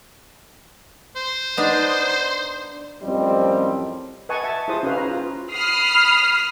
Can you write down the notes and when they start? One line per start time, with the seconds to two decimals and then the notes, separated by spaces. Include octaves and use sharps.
1.16 C5
1.57 B3 D4 D#4
3.03 F#2 A2 F3 G3 C4 D#5
4.29 B4 D#5 F#5 G#5 A5 C#6
4.44 E5 A5
4.68 E4 F4 G#4 C5 D#6
4.83 C#4 D#4 F#4 G#4 B4 F5
4.97 B4 C5 A#5
5.11 F4
5.51 B5 D#6 F6 C7